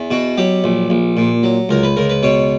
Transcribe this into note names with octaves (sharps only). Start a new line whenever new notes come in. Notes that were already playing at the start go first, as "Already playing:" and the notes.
Already playing: E2
B2 F#4
F#3 G4
A#1
A#1
A#2
F#3
C#2 A#4
B4
C#2 A#4
B4
B2 C#5